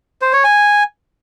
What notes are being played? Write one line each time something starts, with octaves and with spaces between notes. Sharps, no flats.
C5
C#5
G#5